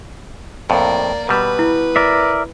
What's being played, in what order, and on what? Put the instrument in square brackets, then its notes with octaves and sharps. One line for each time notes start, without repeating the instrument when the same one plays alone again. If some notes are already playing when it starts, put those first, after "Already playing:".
[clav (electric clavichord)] F2 A2 [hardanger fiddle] A#3 D5
[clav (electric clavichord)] B2 G3 [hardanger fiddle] B4
[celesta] E4
[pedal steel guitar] A#4 D5 E5